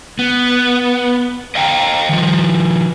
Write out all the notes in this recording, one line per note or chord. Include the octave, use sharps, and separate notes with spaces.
B3
D#5 F5 G5 A#5
D#3 F3